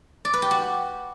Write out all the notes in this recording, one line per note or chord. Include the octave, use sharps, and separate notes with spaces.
D5
B4
G4
F#4